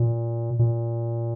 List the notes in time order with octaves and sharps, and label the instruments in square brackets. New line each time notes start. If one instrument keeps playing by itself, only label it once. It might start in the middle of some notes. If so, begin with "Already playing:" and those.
Already playing: [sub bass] A#2
A#2